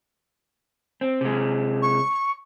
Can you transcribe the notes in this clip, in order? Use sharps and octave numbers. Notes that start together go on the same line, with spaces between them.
C4
C3 G#3
C#6